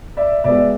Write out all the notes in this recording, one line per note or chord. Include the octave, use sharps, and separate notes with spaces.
D5 E5
B2 G#3 B3 D5 E5